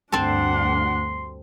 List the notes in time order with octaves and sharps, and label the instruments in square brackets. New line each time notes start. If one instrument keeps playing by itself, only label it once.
[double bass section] D2 G2 [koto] C4 A4 [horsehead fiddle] D4 F#5 [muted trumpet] C6